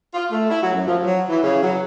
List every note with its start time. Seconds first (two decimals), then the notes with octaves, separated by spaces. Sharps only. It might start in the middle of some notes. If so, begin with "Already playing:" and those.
0.14 F4
0.31 A3
0.49 E4
0.61 F#3
0.73 F#2
0.87 F3
1.03 F#3
1.28 E3
1.43 C#3
1.62 F#3